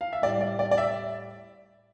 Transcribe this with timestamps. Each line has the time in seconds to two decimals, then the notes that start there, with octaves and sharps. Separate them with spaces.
0.01 F5
0.13 E5
0.22 A2 G3 D5
0.41 D5
0.59 D5
0.71 D5
0.78 E5